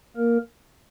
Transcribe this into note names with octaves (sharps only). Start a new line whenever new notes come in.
A#3 A#4